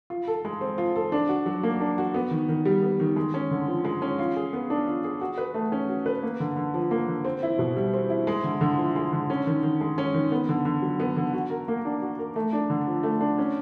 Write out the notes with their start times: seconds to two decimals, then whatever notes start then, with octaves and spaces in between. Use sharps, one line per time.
0.10 F4
0.27 A4
0.45 G#3
0.61 C4
0.78 F4
0.96 A4
1.12 D4
1.29 F#4
1.46 F#3
1.63 A#3
1.80 D4
1.98 F#4
2.14 B3
2.31 D#3
2.49 D#3
2.65 G3
2.83 B3
3.00 D#3
3.16 G#3
3.34 C#4
3.51 D3
3.68 F3
3.85 G#3
4.02 C#4
4.19 F4
4.36 G#4
4.53 B3
4.70 D4
4.87 F4
5.04 G#4
5.21 F#4
5.38 B4
5.54 A3
5.72 C#4
5.89 F#4
6.06 B4
6.23 A#3
6.40 D3
6.56 D3
6.74 F3
6.91 A#3
7.08 D3
7.25 C4
7.43 E4
7.59 B2
7.77 G3
7.94 C4
8.10 E4
8.27 G#3
8.44 D3
8.61 D3
8.78 F3
8.96 G#3
9.12 D3
9.30 C#4
9.47 D#3
9.63 D#3
9.81 G#3
9.98 C#4
10.14 D#3
10.32 B3
10.49 D3
10.65 D3
10.82 F#3
11.00 B3
11.17 D3
11.33 F#4
11.50 A#4
11.68 A#3
11.85 D4
12.02 F#4
12.19 A#4
12.36 A3
12.53 D4
12.70 D3
12.87 F3
13.03 A3
13.21 D4
13.38 C#4